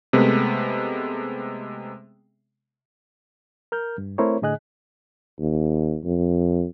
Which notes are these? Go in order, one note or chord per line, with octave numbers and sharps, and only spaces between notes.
C3 G#3 A3 B3
A#4 F6 G6
G2
A3 C4 E4 A#4 C5 C#5
A2 D3 G#4 D#5 G#5 F#6
D#2
F2